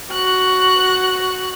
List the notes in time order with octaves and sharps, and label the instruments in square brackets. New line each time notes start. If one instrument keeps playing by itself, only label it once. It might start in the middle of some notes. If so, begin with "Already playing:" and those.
[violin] F#4 F#6